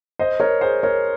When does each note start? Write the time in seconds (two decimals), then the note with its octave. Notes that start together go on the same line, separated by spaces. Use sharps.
0.19 C5 D#5
0.40 A#4 C#5
0.61 G#4 C5
0.83 A#4 C#5